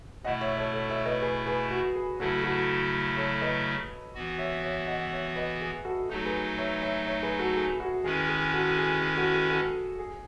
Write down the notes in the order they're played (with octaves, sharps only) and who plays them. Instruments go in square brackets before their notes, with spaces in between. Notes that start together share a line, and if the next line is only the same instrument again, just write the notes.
[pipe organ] B2 A3 E4 [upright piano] D#5 F#5
[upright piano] C#5 E5
A4 C#5
A4 C#5
C#5 E5
B4 D#5
G#4 B4
G#4 B4
F#4
G#4
[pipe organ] C#3 F#3 A3 E4 [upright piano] F#4 A4
[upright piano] F#4 A4
A4 C#5
B4 D#5
[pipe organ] E3 B3 F#4
[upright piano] C#5 E5
C#5 E5
D#5 F#5
C#5 E5
B4 D#5
G#4
F#4 A4
[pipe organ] F#3 A3 D#4 [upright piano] F#4 A4
[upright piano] G#4 B4
C#5 E5
C#5 E5
C#5 E5
G#4 B4
F#4 A4
G#4
F#4
[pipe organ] D#3 G#3 C#4 E4 B4 [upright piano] G#4
[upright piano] G#4
F#4 A4
G#4
G#4
F#4 A4
G#4
F#4 A4
G#4